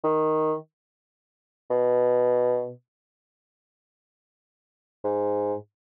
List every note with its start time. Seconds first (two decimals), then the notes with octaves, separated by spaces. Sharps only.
0.04 D#3
1.70 B2
5.04 G#2